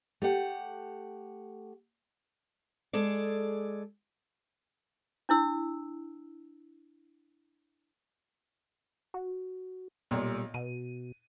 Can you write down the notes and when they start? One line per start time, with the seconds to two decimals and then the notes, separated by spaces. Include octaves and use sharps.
0.22 A3 G4 F#5
2.93 G#3 G#4 A4 D5
5.29 D4 E4 E6
9.14 F#4
10.11 B1 A#2 G3
10.54 B2 D#7